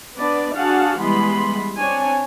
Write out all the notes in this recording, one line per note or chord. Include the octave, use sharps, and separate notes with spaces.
B3 D4 B4 D5
D4 F#4 G#4 F5 F#5 A5
E3 G3 G#3 B3 B5 C6
C4 D4 C#5 G#5